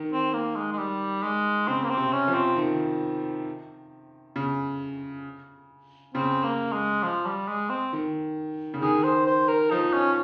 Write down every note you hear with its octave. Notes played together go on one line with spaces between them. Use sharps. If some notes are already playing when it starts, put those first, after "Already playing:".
Already playing: D#3
C4
A#3
G#3
G#3
G3
G#3
C#3 C4
A#3
C4
C3
C#4
F3
C4
D#3
C#3
C#3 C4
A#3
G#3
F3
G3
G#3
C4
D#3
C#3
D#3 G#4
C5
C5
A#4
F3 D#4
C#4